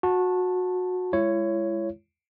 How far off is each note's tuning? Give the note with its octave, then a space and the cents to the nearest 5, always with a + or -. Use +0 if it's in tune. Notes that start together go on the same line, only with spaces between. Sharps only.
F#4 -20 A5 +0
G#3 -10 E4 +40 C#5 +0